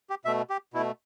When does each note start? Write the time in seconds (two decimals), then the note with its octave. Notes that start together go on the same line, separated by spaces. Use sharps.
0.10 G4
0.25 B2 A3 E5
0.50 G4
0.74 B2 E4
0.78 A3